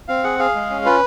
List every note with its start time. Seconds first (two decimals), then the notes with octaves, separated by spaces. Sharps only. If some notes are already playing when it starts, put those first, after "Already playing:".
0.08 C4 F5
0.24 G#4 F#5
0.39 G#4 F5
0.55 G#3
0.70 C#4
0.85 F4 B4